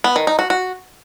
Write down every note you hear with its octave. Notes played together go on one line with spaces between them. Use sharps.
B3
D#3
D#4
F#4
F#4